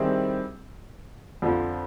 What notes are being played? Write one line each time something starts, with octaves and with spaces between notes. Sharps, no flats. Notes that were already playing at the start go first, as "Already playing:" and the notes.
Already playing: D#3 G3 C4 E4 G#4
F2 D3 F3